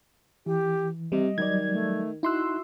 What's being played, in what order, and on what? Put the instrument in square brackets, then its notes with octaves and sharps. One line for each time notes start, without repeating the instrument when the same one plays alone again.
[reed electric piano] E3 [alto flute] G4
[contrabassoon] C3 [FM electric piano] G3 [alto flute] D#5
[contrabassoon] D#3 [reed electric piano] F#3 G3 D5 [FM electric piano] G#6
[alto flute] A3
[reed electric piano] D#4 F#6 [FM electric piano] E4 C6 E6 [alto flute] F#4